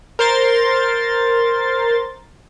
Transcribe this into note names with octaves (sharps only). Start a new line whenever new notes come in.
A#4 C5 C6 A6